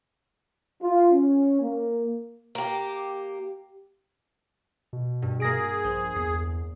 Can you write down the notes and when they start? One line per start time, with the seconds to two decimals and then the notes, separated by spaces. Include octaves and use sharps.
0.81 F4
1.12 C#4
1.61 A#3
2.55 A#3 G4
4.93 B2
5.22 G2
5.40 A#3 G#4 A#6 D7
5.84 A#1 C5
6.16 E2 C7